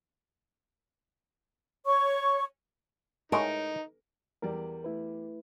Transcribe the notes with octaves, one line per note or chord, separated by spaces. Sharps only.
C#5 C#6
A2 G#3 D#4 A#4 C#5
E2 G3 A#4 D5
A3 E4 B4